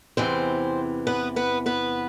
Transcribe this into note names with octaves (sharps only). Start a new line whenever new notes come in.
E2 C3 E3 C4 C5
B3 B4
B3 B4
B3 B4